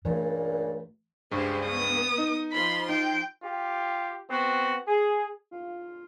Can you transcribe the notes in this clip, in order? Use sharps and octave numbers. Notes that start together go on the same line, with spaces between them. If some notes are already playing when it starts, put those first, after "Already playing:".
C#2 G2 A#2 E3 A3
C#2 G2 G3 G4 G#4 C5
B3 D#6
D#4
F3 F4 B5 C6
D#4 G5
F4 G4
B3 C4 F#4
G#4
F4